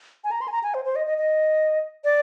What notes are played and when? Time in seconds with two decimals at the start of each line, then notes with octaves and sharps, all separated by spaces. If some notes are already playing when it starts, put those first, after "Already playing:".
0.24 G#5
0.31 A#5
0.41 C6
0.48 G#5
0.52 A#5
0.63 G#5
0.74 C5
0.85 C5
0.96 D#5
1.06 D#5
1.18 D#5
2.04 D5